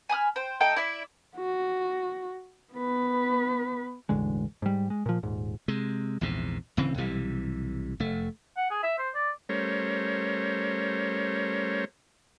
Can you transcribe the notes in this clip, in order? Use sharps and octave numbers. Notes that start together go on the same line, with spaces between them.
G#5 B5 D#6 F6
C5 G5
A3 D#4 A4 G5
E4 D5 E5
F#4
B3 B4
E1 A1 D3 G#3
G#2 G3
G#3
A#2 F3
D#1 G#2
C3 G#3
A#1 E2 G#2 C3
D1 C#3 E3 C4
B1 C3 E3 G3
F1 A3
F#5
G#4
E5
C5
D5
G3 A3 C#4 A#4 C5 C#5